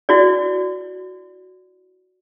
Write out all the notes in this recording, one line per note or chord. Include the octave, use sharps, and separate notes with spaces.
E4 F#4 D5